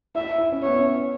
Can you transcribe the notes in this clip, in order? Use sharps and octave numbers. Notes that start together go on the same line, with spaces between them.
E4 E5
E4
C#4
B3 C#5
C#4